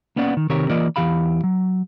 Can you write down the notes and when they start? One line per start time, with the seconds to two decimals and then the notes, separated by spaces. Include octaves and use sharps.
0.16 A#3 B3 C#4 D5 F#5
0.37 D#3
0.50 C3 D#3 C4 G4 A#4 C#5
0.70 E3 A#3 F4 A#4 D5 D#5
0.96 E2 E3 G4 F5 B5
1.44 F#3